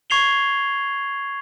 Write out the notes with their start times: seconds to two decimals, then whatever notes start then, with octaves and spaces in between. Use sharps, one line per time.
0.10 C#6 G#6 C7 F7 G7